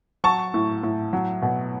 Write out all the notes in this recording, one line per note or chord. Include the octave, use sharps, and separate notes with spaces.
F#3 A5 C#6
A2
A2
F#3
B2